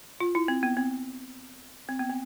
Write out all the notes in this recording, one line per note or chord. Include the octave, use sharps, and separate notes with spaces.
F4
E4
C4
B3
C4
C4
B3
C4